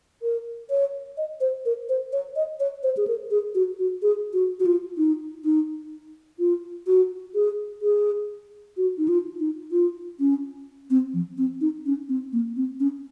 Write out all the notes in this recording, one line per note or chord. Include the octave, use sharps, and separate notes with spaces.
A#4
C#5
D#5
C5
A#4
C5
C#5
D#5
C#5
C5
G#4
A#4
G#4
F#4
F#4
G#4
F#4
F#4
F4
D#4
D#4
F4
F#4
G#4
G#4
F#4
D#4
F4
D#4
F4
C#4
C4
F3
C4
D#4
C#4
C4
A#3
C4
C#4